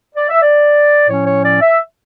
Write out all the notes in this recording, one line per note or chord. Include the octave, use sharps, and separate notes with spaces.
D5
E5
D5
A2 F3 C#4 C#5
C#5
D5
E5